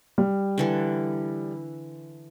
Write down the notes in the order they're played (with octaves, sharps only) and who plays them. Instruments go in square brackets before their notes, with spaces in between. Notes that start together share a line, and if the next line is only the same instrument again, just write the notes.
[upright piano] G3
[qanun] D3 E3 A4